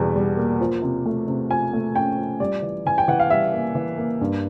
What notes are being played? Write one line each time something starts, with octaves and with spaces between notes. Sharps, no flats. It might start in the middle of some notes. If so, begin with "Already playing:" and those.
Already playing: E2 B2 G3
G3
A#3
F3
C3
A3
C3
F3 G#5
A3
C#4 G5
F3
G3 D5
E3
E3 G#5
G5
E3 F#5
F5
G3 E5
A#3
E3
A#3
G2